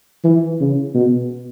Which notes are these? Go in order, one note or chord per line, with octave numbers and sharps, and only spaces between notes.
E3
C#3
B2